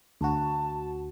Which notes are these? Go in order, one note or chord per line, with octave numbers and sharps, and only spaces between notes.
D2 F#4 A5